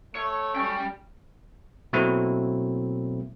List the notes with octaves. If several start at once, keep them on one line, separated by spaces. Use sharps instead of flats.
A3 C#5
G3 C#4 G5
B2 F#3 A3 A#3 C4 E4